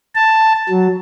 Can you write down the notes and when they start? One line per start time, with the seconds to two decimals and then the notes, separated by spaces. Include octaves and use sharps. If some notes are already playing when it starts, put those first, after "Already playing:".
0.15 A5
0.69 F#3